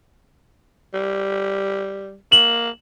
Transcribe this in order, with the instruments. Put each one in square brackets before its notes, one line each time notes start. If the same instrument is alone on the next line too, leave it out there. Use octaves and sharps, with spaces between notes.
[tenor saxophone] G3
[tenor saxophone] A#3 [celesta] E7 F#7